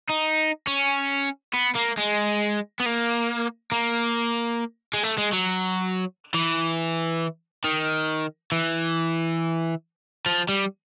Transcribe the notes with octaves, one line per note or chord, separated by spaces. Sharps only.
D#4
C#4
B3
A#3
G#3
B3
A#3
A#3
G#3
A3
G#3
F#3
E3
D#3
E3
F3
G3